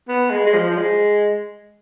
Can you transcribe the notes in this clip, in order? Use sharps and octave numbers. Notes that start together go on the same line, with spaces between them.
B3
G#3
G#3
F3
F3
G#3